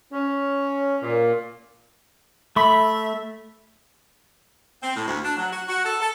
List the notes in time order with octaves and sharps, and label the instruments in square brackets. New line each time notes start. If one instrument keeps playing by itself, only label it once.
[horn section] C#4
A#2
[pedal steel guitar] A3 [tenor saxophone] E5 [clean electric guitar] B5
[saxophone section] C4
A2
D2
D4
F#3
F#4
F#4
A4
A4